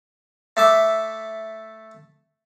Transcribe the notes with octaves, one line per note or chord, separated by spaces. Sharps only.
A3 E5 D6